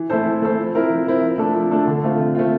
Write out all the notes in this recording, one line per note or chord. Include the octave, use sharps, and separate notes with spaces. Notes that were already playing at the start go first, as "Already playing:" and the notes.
Already playing: E3
A3 E4 A4 C5
E3
A3 E4 A4 C5
F3
C4 E4 A#4
F3
C4 E4 A#4
F3
A3 D4 A4
F3
A3 D4 A4
D3
A3 C4 F4
D3
A3 C4 F4